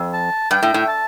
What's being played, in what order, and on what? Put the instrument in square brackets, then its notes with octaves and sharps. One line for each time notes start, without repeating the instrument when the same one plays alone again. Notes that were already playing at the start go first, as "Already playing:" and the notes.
Already playing: [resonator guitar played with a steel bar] F2
[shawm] A5
[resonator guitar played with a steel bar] G2 [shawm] G5
[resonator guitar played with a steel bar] A2
A2
[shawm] A5